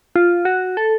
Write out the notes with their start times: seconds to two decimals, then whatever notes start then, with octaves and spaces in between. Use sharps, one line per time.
0.16 F4
0.45 F#4
0.77 A4